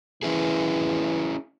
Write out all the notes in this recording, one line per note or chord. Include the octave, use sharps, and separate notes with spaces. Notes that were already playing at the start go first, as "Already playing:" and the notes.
E3 C#4 E4 G#4